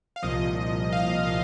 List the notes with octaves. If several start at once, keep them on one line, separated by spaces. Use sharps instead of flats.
F5
C2 A#2 F3 D#5
F5